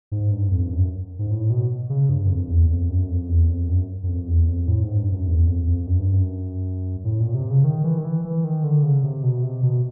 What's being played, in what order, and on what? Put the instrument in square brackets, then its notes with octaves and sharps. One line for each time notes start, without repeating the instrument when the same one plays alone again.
[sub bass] G#2
G2
F2
F#2
G#2
A2
B2
C#3
G2
F#2
F2
E2
F2
F#2
F2
E2
F2
F#2
F#2
F2
E2
F2
A2
G#2
G2
F#2
E2
F2
F2
F#2
G2
F#2
A2
A#2
C3
C#3
D#3
E3
D#3
E3
E3
D#3
D3
C#3
C3
B2
C3
B2